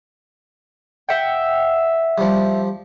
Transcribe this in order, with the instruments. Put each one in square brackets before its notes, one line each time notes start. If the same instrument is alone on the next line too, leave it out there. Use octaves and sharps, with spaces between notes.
[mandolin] E5 F#5 G5
[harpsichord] F3 G3